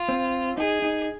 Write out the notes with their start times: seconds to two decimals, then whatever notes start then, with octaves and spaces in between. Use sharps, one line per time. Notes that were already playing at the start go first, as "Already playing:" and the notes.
Already playing: F4
0.09 C4
0.58 D#4 G#4
0.82 D#4